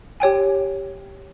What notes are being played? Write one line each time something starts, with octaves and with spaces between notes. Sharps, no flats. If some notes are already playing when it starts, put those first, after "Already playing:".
G4 C#5 G5 G#5